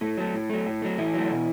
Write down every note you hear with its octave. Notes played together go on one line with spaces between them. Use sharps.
A2 A3
F#3 A3
A2
F#3 A3
A2
F#3 A3
A2 E3 E4
F#3 A3
B2